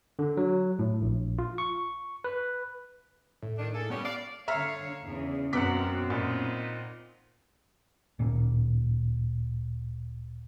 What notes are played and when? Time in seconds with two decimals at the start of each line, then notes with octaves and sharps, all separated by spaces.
0.19 D3
0.37 F#3
0.79 A2
1.02 A#1
1.39 F4
1.58 C#6
2.24 B4
3.42 A2
3.57 D#3 D4
3.73 A#3 G#4 A4
3.90 G3 B3 C#4
4.04 D5 F5
4.48 D3 C#5 E5 F5 A#5 F6
5.04 E2 C#3
5.53 F#2 B2 C4 A#4 B4 F#5 D6 B6
6.10 A#2 B3 D#4
8.19 D1 A#2